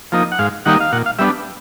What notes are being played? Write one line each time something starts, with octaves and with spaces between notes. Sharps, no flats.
F3 A#3 D#4
F#5
G#2 F5
D#3 G3 A#3 D#4 F#5
F5
A#2 F#5
F5
G3 B3 D4 E5